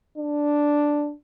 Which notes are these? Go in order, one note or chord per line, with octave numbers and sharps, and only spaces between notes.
D4